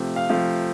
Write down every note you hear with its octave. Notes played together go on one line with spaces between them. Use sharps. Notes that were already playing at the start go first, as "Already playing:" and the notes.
Already playing: C3 F3 A3
F5
C3 F3 A3